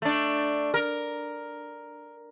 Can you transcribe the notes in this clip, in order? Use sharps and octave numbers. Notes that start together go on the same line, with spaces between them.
A3 D4
A#4